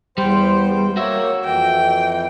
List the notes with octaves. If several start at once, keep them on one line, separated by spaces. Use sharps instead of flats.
E2 G3 C5 G5
A#3 F#4 C#5 E5
F2 E3 G5